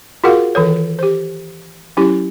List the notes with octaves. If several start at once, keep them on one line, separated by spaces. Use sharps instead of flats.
F4 F#4 G#4 A#4 F5 F#5
D#3 E3 A4 C#5
G4 C5
F#3 C#4 E4 G4